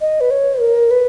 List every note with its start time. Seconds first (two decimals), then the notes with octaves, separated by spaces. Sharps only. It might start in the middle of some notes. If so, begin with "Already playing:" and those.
0.01 D#5
0.21 B4
0.31 C#5
0.60 A#4
0.91 B4